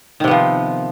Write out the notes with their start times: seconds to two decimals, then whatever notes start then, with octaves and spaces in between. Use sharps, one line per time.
0.20 D#3
0.24 C3
0.28 B3
0.31 F3